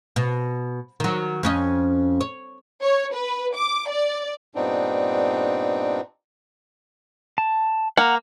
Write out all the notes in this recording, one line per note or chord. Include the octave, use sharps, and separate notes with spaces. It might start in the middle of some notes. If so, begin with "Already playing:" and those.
B2
D#3 F#3
F2 C#4 D#5
C#5
C#5
B4
D6
D5
G2 A#2 B3 C4 D4 D#4
A5
A#3 F#5 A#5